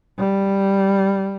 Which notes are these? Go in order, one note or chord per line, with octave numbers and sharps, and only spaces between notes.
G3